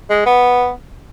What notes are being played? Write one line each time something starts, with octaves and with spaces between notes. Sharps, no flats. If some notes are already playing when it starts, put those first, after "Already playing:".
G#3
B3